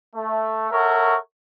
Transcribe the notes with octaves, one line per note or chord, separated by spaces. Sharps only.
A3
A4 A#4 C#5 E5 F#5 C#6